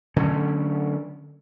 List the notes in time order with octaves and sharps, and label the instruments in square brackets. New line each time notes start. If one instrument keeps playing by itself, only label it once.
[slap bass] D3 F#3 A3 C#4